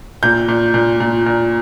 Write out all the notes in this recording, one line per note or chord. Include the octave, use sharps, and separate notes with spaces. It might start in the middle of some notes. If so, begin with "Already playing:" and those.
A#2 G6
A#2
A#2
A#2
A#2